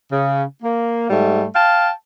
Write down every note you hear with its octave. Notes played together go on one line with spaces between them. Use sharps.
C#3
A#3
G#2 G3 A3
F5 G5 A5